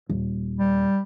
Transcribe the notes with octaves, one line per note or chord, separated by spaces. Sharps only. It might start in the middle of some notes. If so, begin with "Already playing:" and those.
D#1
G3